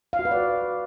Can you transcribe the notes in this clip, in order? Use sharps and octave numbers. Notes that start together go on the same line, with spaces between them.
F5
F#4
B4
D5